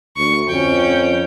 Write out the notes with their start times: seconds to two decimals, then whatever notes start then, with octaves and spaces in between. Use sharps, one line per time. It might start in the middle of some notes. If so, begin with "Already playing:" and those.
0.17 D2 C#6
0.49 F2 C#4 G5